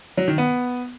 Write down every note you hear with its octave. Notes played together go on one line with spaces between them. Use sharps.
F#3
D#3
B3